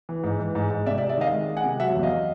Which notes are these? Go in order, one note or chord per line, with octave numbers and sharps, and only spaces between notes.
E3
G#2
E3
G#2
G#2
C3 D5 E5
D5 E5
G#3
D5 E5
D#3 D#5 F5
G#3
G#3
F#5 G#5
C3
F#3 E5 F#5
E2
D#5 F5